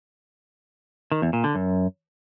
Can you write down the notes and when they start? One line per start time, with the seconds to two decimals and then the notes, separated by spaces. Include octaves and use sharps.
1.12 D#3
1.22 E2
1.33 A#2
1.44 D3
1.55 F#2